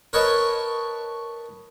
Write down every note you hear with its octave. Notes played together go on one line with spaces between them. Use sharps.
A#4 B4 C#5 D#5 A5